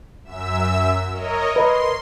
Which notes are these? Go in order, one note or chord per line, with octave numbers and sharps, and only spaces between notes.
F#2 E5 E6
A#4 C#5 D#5
B4 D#5 C6